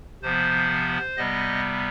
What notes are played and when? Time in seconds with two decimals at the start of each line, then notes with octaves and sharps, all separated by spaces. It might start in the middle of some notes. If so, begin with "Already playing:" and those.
0.23 C3 F3 B3 C5
1.17 C3 G3 B3 D#5